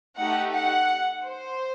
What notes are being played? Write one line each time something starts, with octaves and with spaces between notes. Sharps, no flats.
A3 D#4 G4 F#5
F#5
C5